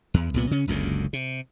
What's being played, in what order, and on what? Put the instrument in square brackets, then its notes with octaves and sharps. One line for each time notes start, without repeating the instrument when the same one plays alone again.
[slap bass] E2
C2 A#2 B3
C#3 C#4
F#1 C#2 F#2 D3
C3